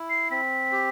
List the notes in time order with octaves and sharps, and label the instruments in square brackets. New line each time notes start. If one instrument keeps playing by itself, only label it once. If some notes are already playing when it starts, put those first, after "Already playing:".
Already playing: [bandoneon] E4
[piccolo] C7
[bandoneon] C4 [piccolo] B6
[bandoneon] G4